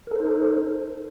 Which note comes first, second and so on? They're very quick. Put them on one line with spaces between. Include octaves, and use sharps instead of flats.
A#4 A4 C5 D#4